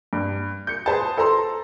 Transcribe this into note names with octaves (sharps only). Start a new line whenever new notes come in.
G2
G6 C#7
G#4 B4 C5 A5
A4 C5 A5 A#5 C6